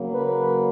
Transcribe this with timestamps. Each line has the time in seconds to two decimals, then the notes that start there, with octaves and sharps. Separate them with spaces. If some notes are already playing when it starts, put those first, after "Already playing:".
Already playing: C#3 F#3 A#3
0.14 B4